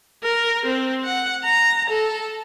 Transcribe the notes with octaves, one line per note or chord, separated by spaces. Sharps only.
A#4
C4
F#5
A#5
A4